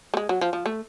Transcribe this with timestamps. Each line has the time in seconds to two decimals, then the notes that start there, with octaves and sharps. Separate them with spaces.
0.14 A3
0.17 G#3
0.29 F#3
0.41 F3
0.53 F3
0.66 A3